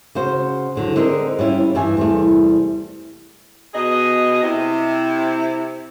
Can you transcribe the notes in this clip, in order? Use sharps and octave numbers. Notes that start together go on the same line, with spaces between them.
C#3 F#4 C5
E2 D3 F#3
D3 C4 D#4 E4 G#4 A#4
G3 C#4 E4 F4
G2 E3 E5 G#5
E2 C3 G3 A3
B2 G#4 D#5
C3 E4